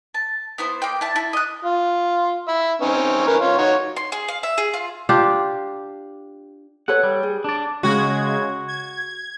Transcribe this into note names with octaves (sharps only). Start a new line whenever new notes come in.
A5
B3 E4 C5
A#3 G5
E4 A5
E4
D#5 F#6
F4
E5 B5
C4 C#4 D#4
C#4 A#4 B4
F4 C#5
D#4 F#4 C#5
C6
G#4
F5
E5
G#4
F4
D4 F4 G4
A4 B4 C#5 F#5
G3
G#4
D4 D5
C#3 G#3 F#4 G#6
G#6